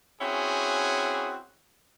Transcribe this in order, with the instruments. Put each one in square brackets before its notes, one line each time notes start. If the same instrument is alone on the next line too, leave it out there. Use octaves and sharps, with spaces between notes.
[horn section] C4 C#4 E4 F#4 G#4